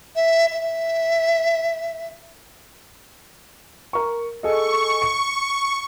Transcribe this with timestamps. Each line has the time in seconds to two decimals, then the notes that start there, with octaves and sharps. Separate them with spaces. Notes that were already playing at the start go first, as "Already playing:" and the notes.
0.16 E5
0.52 E5
3.93 A#4 C#6
4.43 G#4 A4 D#5 C#6
5.02 C#7